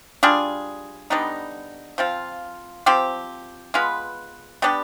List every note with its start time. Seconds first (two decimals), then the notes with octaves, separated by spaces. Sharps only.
0.23 G3 D4 F4 G#4
1.10 D3 G3 B3 D#4
1.98 F3 C4 F4
2.86 F3 C4 G4
3.74 G#3 B3 F4 B4
4.62 G3 B3 D4 G4